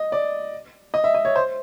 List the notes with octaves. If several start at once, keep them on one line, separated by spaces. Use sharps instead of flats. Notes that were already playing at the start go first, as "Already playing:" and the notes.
Already playing: D#5
D5
D#5
E5
D#5
C#5
C5